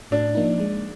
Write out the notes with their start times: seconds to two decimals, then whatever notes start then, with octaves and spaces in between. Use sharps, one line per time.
0.11 A2 D4
0.35 F3 A#3 D#4
0.60 G#3